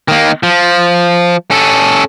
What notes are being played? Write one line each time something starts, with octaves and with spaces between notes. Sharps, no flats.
D#3 A#3
F3
C#4 A4